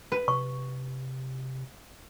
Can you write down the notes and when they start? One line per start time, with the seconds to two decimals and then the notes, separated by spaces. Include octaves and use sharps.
0.12 B4
0.28 C3 C#6